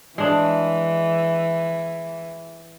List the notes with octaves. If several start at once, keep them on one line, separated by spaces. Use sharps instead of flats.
E3 G#3 D4